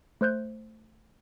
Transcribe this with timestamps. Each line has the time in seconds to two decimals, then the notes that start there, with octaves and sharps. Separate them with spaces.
0.21 A3 C5 F#6 G6